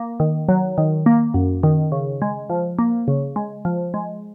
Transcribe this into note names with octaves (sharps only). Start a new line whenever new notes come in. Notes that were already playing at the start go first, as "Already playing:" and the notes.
Already playing: A#3
D#3
F#3
D#3
A#3
F#2
D#3
C#3
G#3
F3
A#3
C#3
G#3
F3
G#3